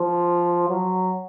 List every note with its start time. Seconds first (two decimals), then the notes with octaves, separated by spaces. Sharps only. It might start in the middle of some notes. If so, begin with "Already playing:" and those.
Already playing: F3
0.69 F#3